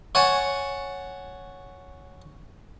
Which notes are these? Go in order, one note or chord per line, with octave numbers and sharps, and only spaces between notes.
C#5 F#5 G#5 A5 C#6